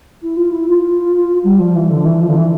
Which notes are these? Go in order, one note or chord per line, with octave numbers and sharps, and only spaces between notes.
E4
F4
E4
F4
G3
F3
E3
D3
E3
F3
D3
E3